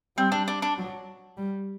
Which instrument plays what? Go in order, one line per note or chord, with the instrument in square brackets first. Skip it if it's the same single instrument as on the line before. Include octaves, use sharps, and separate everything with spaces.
[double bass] G3 [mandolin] C4
[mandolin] D4
D4
D4
[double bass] F#3
G3